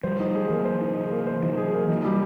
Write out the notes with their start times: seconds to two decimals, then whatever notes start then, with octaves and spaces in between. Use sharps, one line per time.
0.03 F3 G3 C5
0.20 D#4
0.35 G#4
0.50 E3 F#3 A#3
0.65 C5
0.81 D#4
0.96 G#4
1.12 A#3
1.27 C5
1.43 E3 F#3 D#4
1.57 G#4
1.74 A#3
1.89 E3 F#3 D#4
2.05 G3